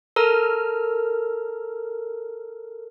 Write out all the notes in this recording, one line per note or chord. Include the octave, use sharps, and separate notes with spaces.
A4 A#4 A#5 F6